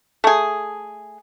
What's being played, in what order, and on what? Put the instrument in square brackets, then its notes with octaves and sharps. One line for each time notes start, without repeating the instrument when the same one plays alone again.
[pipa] A3 G#4